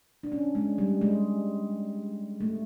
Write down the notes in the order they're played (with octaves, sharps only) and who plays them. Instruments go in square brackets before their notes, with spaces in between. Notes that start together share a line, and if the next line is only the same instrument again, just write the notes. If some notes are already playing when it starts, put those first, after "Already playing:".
[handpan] D4
C#4
G#3
G3
G#3
A3